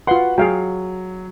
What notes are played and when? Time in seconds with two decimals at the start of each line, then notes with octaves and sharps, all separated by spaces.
0.07 F4 F#4 B4 F#5 C6
0.38 F#3 G#4 F5 G5